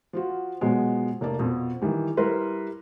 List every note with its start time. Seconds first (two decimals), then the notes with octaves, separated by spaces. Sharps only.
0.13 F3 F4 F#4
0.61 B2 F3 F#3 G#3 B3
1.21 F1 A#3 D5 A5
1.39 F2 B2 F3
1.82 D#3 E3 G3
2.17 G3 E4 A#4 B4 C6